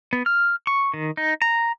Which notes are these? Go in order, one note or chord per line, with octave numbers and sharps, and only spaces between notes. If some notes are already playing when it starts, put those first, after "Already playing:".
B3
F6
C#6
D#3
D#4
A#5